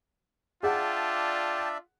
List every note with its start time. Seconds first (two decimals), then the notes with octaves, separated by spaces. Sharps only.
0.63 D4 F4 G#4 D5 E5 F#5 G5 A5